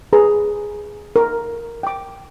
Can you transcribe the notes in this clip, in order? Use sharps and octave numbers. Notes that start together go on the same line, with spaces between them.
G#4 B4 A#5
A#4
G5 D6